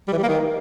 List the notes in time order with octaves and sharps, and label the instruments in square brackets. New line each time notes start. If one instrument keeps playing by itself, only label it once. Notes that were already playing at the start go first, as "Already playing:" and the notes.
[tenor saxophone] G3
E3
G3
A#3
D#3